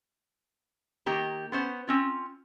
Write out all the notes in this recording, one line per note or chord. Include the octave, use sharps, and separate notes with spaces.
D#3 A#3 G4 A#5
B3 C#4 C5
C4 C#4 F4